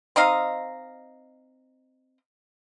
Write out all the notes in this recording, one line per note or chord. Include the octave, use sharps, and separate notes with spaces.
C4 D#4 D#5 F5